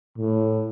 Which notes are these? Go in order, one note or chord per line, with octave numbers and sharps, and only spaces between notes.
A2